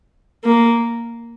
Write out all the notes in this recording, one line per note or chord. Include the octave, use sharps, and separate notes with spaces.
A#3